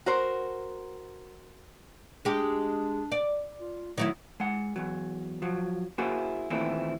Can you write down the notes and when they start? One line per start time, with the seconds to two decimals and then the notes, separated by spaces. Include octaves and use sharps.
0.06 F#4 A#4 C5
2.25 G#3 D4 G4
3.12 D5
3.61 F4
3.98 D#3 F#3 A3 E4
4.40 G#3 F#5
4.76 E2 F#3
5.42 F3 F#3
5.98 A#3 E4 F#4 G#4 A#4 C5
6.50 D#2 A#2 E3 A3 C4 E4